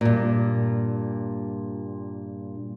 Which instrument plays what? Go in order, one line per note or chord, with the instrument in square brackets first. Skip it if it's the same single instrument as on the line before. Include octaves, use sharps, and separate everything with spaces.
[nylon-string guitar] G2 A#2